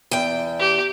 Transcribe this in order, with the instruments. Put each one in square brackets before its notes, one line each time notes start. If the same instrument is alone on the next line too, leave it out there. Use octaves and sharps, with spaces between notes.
[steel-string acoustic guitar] E2 G5
[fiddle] G4